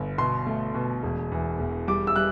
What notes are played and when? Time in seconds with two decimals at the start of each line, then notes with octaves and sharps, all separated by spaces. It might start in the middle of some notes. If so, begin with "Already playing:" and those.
Already playing: G1
0.18 B2 C6
0.46 A3
0.74 B2
1.03 E1
1.32 E2
1.59 E1
1.88 G3 D6
2.07 E6
2.16 G3 F#6